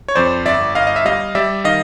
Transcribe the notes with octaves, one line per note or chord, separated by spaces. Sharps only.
C#5
F2 C5 D5
G1 D5 E5
G1 D#5 F5
D#5
E5
G3 D#5 F5
G3 D5 E5
D#3 D#5 F5